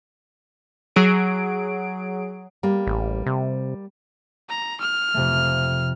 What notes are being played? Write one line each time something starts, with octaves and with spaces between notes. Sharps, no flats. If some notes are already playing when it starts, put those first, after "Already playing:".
F#3 G#4 D7
G3 A#3
A1
C3
A#5
F6
F2 C3 A3